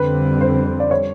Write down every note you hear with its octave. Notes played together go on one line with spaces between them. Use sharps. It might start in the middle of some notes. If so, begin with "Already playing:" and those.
Already playing: F2 D3 G3 C4 B4
C5
D5
C#5